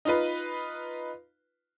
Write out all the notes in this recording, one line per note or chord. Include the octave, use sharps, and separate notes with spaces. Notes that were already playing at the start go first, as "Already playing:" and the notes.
D#4 F4 B4